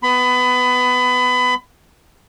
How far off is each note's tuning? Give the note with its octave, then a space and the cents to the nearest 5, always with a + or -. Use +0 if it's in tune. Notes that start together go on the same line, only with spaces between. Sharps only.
B3 +15 B5 +25